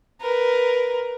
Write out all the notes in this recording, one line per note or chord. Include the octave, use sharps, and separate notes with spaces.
A#4 B4